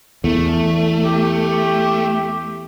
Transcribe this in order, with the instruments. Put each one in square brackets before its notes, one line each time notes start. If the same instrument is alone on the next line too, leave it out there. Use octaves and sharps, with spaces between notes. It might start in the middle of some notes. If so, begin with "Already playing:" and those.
[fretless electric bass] E2 [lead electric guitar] A3
[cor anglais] G4